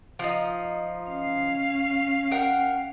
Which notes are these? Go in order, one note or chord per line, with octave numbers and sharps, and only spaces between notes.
F3 D#4
C#4 F5
A#4 F#5 G5